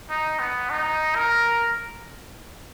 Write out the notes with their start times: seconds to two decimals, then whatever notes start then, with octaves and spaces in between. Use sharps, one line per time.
0.10 D#4
0.39 B3
0.70 D#4
1.15 A#4